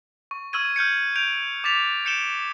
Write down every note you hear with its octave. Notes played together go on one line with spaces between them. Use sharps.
C#6
C#6 E6 F6 G#6 D#7
F6 G6 G#6 C#7
G6 D7 F7
D6 A6 B6 F7
G6 C#7 D7 E7 G7